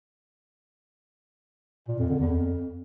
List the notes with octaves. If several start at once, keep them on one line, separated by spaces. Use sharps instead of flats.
A#2
F2
D3
E2
F2